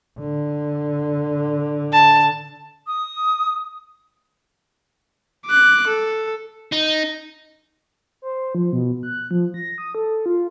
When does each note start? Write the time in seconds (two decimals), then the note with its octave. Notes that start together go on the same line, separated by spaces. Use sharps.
0.20 D3
1.93 A5
2.87 D#6
5.46 D6 F#6
5.87 A4
6.72 D#4
8.22 C5
8.55 F3
8.73 B2
9.03 F#6
9.31 F3
9.54 A#6
9.78 D#6
9.95 A4
10.26 F4